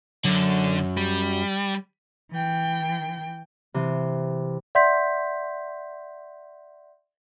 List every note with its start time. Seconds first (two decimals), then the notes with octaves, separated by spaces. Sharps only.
0.25 F#2 D3 F#3
0.97 G3
2.32 E3 G5
3.74 C3 E3
4.75 D5 E5 F#5 C6 G6 B6